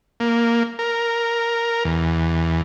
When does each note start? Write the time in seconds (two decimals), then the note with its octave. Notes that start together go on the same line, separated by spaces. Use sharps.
0.20 A#3
0.79 A#4
1.85 E2